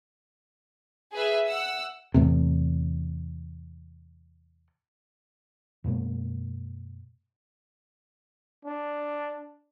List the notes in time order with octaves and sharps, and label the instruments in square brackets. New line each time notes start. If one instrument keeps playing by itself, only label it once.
[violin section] G#4 B4 E5
F#5 E6
[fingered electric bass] E2 A2 C3
F#2 B2 G#3 A#3
[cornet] D4